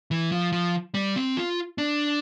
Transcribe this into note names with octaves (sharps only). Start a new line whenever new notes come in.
E3
F3
F3
G3
C4
F4
D4